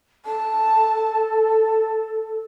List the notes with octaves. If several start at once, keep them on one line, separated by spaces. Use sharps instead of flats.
A4 A5